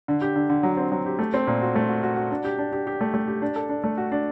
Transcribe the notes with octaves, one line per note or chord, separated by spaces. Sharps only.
D3
G4
D3
D3
F#3
C4
F#3
G4
A3
C4
A#2
F#4
A3
F#4
F#4
F#4
D4
G4
D4
G4
G4
A3
A3
G4
D4
A4
D4
A3
F#4
D4